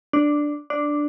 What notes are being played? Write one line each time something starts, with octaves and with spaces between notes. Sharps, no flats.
D4
D4